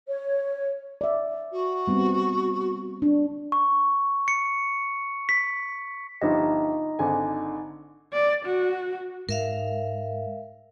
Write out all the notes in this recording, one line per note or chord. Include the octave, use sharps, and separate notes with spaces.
C#5
D5 E5
F#4
G3 B3 C4
D4
C#6
C#7
B6
G1 F3 D#4 G4 D#5
G#1 D3 G#5
D5
F#4
G#2 A#4 E5 F5